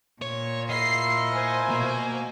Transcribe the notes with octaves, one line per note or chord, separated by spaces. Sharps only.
A#2 C#5
E4 F4 A#4 D#5 C7
C5 G#5
B2 A#3